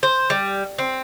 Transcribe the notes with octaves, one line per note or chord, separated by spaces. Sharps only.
C5
G3
C4